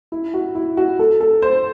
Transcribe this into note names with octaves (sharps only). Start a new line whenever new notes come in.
E4
F#4
E4
F#4
A4
A4
C5